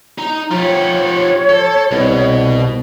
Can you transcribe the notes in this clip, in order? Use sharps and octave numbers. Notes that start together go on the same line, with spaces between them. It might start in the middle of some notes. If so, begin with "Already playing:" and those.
D#4 A#5
F3 F4 G4 C#5
A4
C2 B2